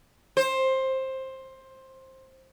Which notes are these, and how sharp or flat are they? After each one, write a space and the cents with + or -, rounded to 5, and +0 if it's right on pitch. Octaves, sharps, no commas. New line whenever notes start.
C5 +15